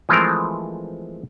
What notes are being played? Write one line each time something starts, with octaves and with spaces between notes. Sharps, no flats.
E3 F3 G#3 A3 C4 A#4